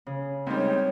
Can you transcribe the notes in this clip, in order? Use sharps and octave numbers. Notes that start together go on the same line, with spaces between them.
C#3
C#2 D#3 G3 C4 C#4 C#5